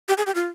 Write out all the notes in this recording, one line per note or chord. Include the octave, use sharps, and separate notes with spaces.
G4
G#4
G4
F4